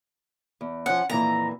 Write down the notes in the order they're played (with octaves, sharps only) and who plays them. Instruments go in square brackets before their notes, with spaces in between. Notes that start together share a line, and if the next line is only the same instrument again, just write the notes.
[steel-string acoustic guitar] E2
[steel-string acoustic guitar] F3 C#4 [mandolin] F#5
[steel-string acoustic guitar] F2 A#2 E3 [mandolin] A#5